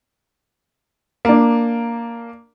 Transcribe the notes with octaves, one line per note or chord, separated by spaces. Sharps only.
A#3 D4